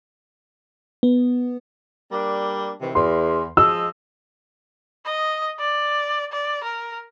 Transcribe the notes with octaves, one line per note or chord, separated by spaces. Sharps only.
B3
G3 A#3 D4
C3 D#3 E3
E2 C6
F3 G#3 D#5 E6
D#5
D5
D5
A#4